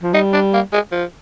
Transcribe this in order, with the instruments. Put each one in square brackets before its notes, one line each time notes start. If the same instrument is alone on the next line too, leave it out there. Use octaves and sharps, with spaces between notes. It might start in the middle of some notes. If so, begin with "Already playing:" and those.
[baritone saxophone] F3
[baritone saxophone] G3 [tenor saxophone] D#4
[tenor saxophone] D4
A#3
G#3
F3